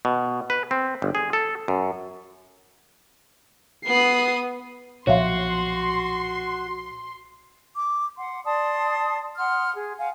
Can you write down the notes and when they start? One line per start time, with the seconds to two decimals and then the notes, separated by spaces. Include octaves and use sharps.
0.05 B2
0.50 B4
0.71 C4
1.02 G1
1.15 G#4
1.33 A4
1.68 F#2
3.85 B3 D#6 C7
5.07 B1 A#2 F3 F#4 C#5 E5 F5 C6
7.76 D6
8.17 F#5 C6
8.44 D5 A5 C6 D#6
9.37 F#5 C6 D#6 F6
9.74 G#4
9.98 F5 F#5 G#5